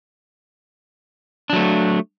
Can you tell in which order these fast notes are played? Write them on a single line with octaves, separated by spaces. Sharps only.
D4 F#3 A3